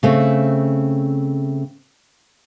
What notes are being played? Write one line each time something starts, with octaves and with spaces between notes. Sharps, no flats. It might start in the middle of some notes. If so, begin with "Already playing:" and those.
C#3 A3 C4